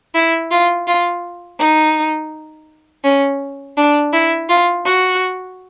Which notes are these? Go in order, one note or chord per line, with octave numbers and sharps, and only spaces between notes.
E4
F4
F4
D#4
C#4
D4
E4
F4
F#4